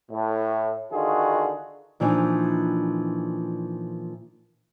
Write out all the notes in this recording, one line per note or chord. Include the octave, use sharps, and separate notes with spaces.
A2
D3 D#3 F4 F#4 G#4
A#2 E3 F3 D4 D#4